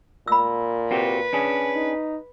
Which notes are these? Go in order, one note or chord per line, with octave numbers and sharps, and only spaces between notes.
A#2 B5 E6
C4 F#4 G4 B4
C#4 D4 G#4
D#4